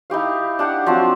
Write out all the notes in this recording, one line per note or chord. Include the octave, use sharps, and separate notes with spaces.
D#4 E4 G4 F5
D4 G4 F5 F#5
F3 F#3 C4 D4